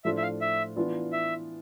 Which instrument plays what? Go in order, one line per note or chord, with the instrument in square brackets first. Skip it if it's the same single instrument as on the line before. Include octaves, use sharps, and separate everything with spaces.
[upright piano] A2 F3 A3 D4 F4 [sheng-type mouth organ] E5
[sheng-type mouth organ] E5
F5
E5
[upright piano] E3 B3 D4 F4 B4
[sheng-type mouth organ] E5